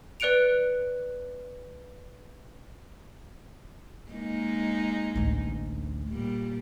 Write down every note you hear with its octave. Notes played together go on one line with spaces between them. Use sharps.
B4 D5 F#6 C#7 D7 F7
G#3 A#3 D#4
A1 D2
A#2 G3